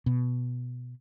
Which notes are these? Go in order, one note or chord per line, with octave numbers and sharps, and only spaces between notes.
B2